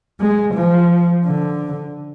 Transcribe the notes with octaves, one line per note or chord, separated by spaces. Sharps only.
G#3
F3
D3